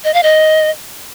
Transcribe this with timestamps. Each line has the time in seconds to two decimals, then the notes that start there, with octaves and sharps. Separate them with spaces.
0.04 D#5
0.14 F5
0.23 D#5